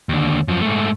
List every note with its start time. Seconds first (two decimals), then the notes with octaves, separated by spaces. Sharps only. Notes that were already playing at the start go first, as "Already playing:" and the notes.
0.09 D#2 D3
0.48 F#2 F3
0.61 G#2 A3